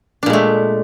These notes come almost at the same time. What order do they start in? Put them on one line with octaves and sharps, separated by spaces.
D4 A#2 G#3 A3